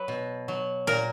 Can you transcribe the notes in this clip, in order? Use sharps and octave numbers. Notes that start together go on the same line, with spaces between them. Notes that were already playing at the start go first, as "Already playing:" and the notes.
Already playing: F#3 B4
B2
F#3
A#2 A#4